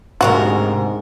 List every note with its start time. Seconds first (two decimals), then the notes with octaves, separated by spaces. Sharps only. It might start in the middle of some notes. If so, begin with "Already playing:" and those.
0.21 D2 G#2 C3 F#4 A#4